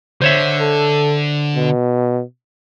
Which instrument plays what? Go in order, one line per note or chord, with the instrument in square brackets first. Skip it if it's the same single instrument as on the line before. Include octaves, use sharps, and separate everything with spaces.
[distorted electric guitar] D3 [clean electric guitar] C5 C#5 E5
[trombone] A4
B2